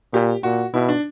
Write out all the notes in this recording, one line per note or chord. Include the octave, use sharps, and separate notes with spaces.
A#2 G4
A#2 F#4
B2 E4
D4